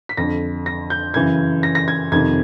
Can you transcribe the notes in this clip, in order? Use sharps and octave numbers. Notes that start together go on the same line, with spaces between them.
B6
F2 D3 A#6
A#6
G6
F#2 C#3 E3 G#6
A#6
A#6
G#6
F2 C3 D#3 G#6